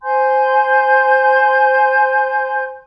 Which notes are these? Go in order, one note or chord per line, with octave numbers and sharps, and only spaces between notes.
C5 G#5 C6 G6